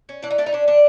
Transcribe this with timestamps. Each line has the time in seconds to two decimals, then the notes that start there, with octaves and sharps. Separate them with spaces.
0.09 C#4
0.23 E3 D4
0.30 D#4
0.38 A3 D4
0.46 D#4
0.52 C#4 D4
0.67 D3 D4